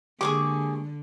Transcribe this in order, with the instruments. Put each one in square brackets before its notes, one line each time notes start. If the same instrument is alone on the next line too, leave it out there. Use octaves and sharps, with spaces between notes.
[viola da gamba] D3 [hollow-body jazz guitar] G#3 A#3 G4 [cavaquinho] G#4 C#6 D6